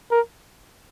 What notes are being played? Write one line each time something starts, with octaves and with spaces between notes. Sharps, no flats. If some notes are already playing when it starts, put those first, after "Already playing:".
A#4